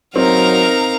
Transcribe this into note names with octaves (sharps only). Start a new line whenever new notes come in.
F#3 C4 D#4 A#4 F5 A#5